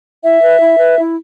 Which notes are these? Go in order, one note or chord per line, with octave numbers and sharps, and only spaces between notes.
E4 E5
B4
E4
B4
E4